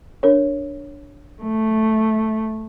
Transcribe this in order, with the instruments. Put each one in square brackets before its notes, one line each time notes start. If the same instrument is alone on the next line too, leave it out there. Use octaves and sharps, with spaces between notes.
[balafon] D4 A#4 C#5
[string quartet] A3